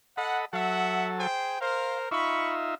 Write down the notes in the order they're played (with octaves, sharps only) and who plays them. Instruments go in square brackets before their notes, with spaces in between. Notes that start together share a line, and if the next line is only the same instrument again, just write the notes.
[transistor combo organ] A4 D#5 B5 [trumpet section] F#5
[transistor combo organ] F#3 A4 [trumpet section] E5 F#5
[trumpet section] G#4 C5 G5
[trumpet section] A#4 C5 [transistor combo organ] F5
[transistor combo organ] D#4 F4 E5 [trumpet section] B5 C#6